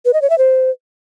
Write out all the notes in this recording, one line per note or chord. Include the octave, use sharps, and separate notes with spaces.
B4
D#5
C#5
E5
C5